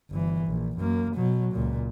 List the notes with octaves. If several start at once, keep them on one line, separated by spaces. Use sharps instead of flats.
G1 E3
A#1
F#2 A#3
B2 F#3
C#2 A#2